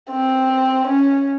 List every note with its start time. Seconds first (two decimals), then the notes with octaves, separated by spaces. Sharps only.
0.11 C4
0.88 C#4